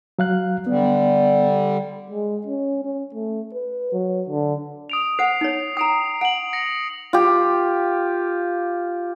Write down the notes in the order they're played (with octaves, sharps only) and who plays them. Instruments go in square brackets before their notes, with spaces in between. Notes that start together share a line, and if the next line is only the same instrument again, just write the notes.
[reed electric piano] F#3 F5 F#6
[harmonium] D3 G3 [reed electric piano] B3
[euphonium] G#3
C#4
C#4
A3
B4
F#3
D3
[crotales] D#6 D7 F7
[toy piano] C5 F#5 [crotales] C7
[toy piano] D#4 C#5
[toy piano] G5 A#5 [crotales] D#6 D7
[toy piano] F#5 [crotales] D7 F#7
[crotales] A#6 C#7
[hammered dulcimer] F4 G4